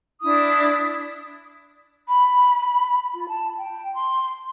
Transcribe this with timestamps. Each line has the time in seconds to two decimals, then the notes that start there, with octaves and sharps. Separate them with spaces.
0.22 D4 E4 D#6
2.08 B5
3.14 F4
3.28 A5
3.57 G5
3.94 C6